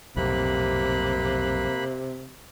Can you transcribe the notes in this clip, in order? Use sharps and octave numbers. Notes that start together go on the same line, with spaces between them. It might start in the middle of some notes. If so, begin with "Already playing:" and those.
B1 F2 A2 C3 A#3 B5 F#6